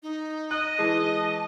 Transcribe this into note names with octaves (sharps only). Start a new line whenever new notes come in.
D#4
D#5 F#6
E3 G#3 A5